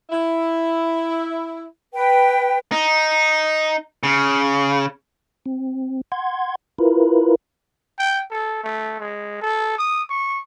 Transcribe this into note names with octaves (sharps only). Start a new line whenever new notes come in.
E4
B4 G5
D#4
C#3
C4
F#5 C6 G#6
E4 F4 A#4 B4
G5
A4
A3
G#3
A4
D#6
C#6